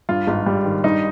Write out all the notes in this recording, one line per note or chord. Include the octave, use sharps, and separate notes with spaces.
G2 F4
G#1
G3
D#3
G2 D#4